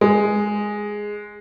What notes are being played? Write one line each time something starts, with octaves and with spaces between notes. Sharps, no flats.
G#3